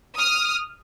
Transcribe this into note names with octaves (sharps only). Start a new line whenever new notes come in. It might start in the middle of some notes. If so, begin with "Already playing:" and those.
D#6 F6